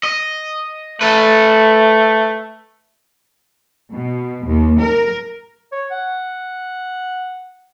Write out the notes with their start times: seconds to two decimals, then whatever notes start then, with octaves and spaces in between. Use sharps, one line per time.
0.03 D#5
1.01 A3 A4 B4
3.92 B2
4.46 D#2
4.80 A#4
5.72 C#5
5.91 F#5